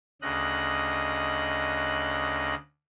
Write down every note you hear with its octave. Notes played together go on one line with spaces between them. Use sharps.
D2 C#3 D#5 F#6